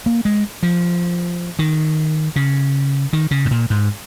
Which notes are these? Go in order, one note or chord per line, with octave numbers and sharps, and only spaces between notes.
A#3
G#3
F3
D#3
C#3
D#3
C#3
G#2
A#2
G#2